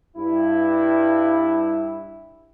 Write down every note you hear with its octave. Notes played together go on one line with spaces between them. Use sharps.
G2 E4